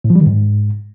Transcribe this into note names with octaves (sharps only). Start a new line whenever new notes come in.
A2
F3
G3
D#3
G#2